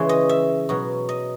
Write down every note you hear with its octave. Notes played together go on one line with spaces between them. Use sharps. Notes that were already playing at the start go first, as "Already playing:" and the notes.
Already playing: C#3 E3 G#3
D#5
E5
B2 F#3
D#5